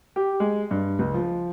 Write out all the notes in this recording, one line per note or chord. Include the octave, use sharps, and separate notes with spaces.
G4
G#3
G2
C#2
F3